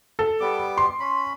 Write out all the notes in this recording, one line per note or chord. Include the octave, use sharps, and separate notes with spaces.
A4
G3 B3 D6
C6
C#4 B5